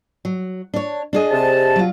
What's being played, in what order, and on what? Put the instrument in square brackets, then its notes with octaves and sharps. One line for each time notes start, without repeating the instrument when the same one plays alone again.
[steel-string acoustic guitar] F#3
D4 C#5
D4 G#4 D#5
[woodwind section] C3 A5
[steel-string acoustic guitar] F#3 F4